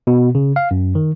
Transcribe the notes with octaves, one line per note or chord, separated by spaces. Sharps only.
B2
C#3
F5
F#2
D#3